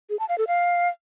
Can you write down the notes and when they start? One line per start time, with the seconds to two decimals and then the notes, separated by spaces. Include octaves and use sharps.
0.10 G#4
0.19 A5
0.29 F5
0.38 A4
0.48 F5